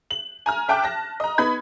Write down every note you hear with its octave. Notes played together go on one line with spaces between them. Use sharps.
F#7
G#5 A#5 F6
E5 G5 A5 D6 F#6
A5 A#6
D#5 A#5
B3 D#4 B5 G#6